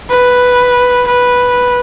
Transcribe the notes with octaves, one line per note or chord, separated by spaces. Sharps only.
B4
B4